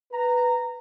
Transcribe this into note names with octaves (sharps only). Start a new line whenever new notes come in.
B4 A#5